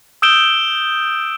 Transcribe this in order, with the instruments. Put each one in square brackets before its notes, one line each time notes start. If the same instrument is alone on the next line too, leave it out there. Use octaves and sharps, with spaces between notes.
[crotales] D#6 E6 G6 D7 E7 G7